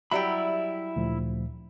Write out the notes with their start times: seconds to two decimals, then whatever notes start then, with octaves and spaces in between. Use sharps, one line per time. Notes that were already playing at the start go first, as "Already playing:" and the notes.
0.11 F#3 G3 E4 E5 G5 B5
0.96 D2 A#2 F3